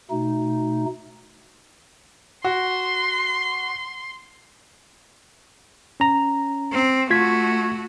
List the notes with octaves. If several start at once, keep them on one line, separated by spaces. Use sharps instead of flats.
B2 A3 D#4
F#4 C6
C#4 A#5
C4
A3 F4 F#4 G#6 B6